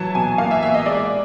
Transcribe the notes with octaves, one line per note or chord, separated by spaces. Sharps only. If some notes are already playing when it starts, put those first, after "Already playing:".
Already playing: E3 F#3 A5
B2 G#5
A#3 F5
E5
A#3 E5
D#5
G#3 D5